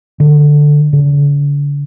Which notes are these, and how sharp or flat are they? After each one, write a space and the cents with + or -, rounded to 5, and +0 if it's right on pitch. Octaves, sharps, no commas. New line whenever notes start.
D3 +5
D3 -40